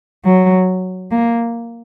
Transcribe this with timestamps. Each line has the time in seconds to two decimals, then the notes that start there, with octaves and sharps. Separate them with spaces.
0.25 F#3
1.11 A#3